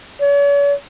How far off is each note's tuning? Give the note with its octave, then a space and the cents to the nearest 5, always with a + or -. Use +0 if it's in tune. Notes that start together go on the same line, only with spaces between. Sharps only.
C#5 +45